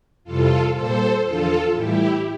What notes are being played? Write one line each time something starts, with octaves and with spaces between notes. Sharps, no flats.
F2 C3 E3 G3 F4 A4
A#2 G3 A4 C5
E2 D3 F3 F4 A4
A2 E3 G3 E4 G4